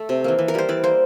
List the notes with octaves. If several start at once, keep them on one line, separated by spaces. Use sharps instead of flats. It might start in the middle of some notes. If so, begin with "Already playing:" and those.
Already playing: A3 A4
C3
E3 A#3
E3
A#4
G3 A#3 C5
E3 D5
A#3 C5